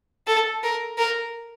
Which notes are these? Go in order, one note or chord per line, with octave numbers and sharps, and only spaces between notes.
A4
A#4
A#4